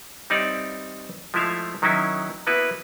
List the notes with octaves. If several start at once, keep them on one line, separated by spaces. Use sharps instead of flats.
G3 C4 D#4 C#5 D5 E5
F3 G#3 A3 E4 E5 F5
D#3 F#3 C#4 D#4 E4
A#3 B3 E4 F#4 B4